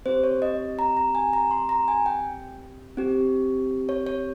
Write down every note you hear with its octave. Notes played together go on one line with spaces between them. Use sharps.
C4 G4 C5
C#5
D#5
A#5
A#5
G#5
A#5
C6
A#5
G#5
G5
C4 G4
C#5
C#5